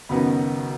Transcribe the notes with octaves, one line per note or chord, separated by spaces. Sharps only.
F#1 F#2 D#3 B3 D#4 B5